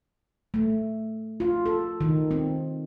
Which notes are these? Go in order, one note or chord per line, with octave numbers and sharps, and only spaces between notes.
A3
F4
A4
D#3
C4